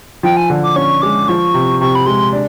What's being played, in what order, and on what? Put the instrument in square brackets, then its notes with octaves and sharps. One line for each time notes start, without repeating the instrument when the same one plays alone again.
[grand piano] F3 [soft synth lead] G5
[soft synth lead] G#5
[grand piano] D3
[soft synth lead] D6
[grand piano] C#4 [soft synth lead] C#6
[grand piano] G#3 [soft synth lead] D6
[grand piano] F3 [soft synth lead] C#6
[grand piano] C3
[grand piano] C3 [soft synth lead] C#6
[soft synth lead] B5
[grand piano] G#3 [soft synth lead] C6
[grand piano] D4